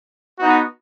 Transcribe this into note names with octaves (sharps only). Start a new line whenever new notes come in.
B3 D#4 F#4